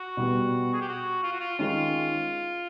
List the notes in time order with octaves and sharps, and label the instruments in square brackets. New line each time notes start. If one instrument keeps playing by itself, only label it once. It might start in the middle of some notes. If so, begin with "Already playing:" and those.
Already playing: [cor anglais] F#4
[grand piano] B2 G3 B3
[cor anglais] G#4
G4
F#4
F4
F#4
F4
[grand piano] D#3 G#3 C#4 [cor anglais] F4